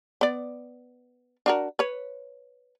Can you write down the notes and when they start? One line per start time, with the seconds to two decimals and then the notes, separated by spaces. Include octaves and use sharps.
0.21 B3 D5
1.46 D4 F#4 A#4
1.79 B4 C#5